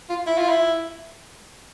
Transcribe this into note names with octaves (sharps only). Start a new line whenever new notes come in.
F4
E4
F4
E4